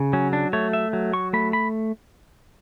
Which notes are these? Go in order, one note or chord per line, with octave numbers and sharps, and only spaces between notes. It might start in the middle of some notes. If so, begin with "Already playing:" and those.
Already playing: C#3
F#3 C#4
D4
A3 C#5
E5
F#3
C#6
A3 B5
B5